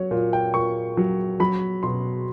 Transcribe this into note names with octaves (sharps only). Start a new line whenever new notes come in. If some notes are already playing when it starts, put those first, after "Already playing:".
Already playing: F#3 C#5
A#2
G5
A#2 C#6
F#3
F#3 B5
B2 C6